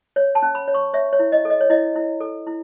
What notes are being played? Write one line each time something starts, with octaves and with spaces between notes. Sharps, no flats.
C#5
A5
C#4
B5
C#5
C#6
C#5 E5
C#5
E4
D#5
A4
D#5
C#5
E4 D#5
E4
A4
E4